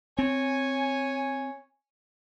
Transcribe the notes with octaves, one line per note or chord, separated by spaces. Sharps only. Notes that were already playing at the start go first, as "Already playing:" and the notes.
C4 C#5 G#5